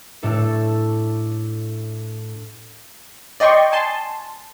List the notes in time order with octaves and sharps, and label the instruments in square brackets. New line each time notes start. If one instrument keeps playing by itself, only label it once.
[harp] A2 A3 D4 A4
[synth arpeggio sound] D5 D#5 G5 C6 C#6
G#5 A5 C6